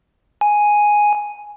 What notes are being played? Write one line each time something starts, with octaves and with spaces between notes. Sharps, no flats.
G#5